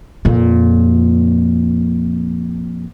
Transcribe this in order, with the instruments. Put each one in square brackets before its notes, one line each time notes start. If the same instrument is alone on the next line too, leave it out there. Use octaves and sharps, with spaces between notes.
[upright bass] F2 A#2